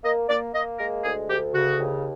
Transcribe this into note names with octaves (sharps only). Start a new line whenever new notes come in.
A#3 D#5
A#3 D5
A#3 D#5
G#3 A#4
D2 G#4
D2 G4
C#3 F#4
D#2